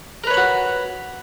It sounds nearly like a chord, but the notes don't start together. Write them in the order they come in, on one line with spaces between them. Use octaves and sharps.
A#4 B4 C#5 B5 F#4